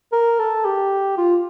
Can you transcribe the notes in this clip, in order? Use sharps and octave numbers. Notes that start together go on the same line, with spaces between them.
A#4
A4
G4
F4